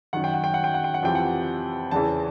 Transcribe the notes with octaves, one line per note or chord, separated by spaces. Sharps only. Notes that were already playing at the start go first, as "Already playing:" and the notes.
F#2 D#3 F#5
G5
F#5
G5
F#5
G5
F#5
G5
F#5
F2 C3 E3 G5
F#5
E2 C#3 E3 A5